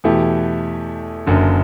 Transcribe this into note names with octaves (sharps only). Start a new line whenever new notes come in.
E2 B2 A3 E4 G4
F#1 F#2 D3